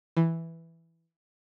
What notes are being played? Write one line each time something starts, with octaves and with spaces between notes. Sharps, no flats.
E3